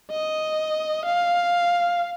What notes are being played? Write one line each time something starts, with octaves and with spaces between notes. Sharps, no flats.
D#5
F5